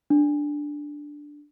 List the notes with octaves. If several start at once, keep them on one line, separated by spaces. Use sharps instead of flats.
D4